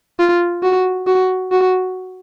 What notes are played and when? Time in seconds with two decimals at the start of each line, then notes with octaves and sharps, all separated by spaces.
0.19 F4
0.63 F#4
1.07 F#4
1.52 F#4